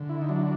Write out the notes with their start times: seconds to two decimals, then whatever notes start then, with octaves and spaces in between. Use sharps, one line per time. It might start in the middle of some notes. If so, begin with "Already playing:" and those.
Already playing: D3
0.09 E4
0.21 D#4
0.29 F#3 D4